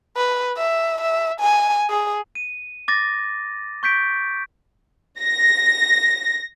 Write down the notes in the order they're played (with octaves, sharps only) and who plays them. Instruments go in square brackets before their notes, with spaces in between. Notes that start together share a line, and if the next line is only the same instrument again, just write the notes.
[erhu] B4
E5
E5
G#5
G#4
[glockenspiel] D#7
D6 A6 A#6
C#6 G6 B6 D7
[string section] A#6